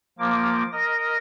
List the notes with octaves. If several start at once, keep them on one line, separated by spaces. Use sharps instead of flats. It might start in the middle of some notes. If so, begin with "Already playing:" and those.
F3 A#3 D6
A#4 D#5 A#6